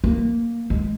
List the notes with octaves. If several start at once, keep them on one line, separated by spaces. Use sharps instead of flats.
A#3
G#3